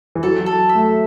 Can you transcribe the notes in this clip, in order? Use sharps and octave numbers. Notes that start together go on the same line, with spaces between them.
E3
F#3 A4
F#3
A4
E5
A3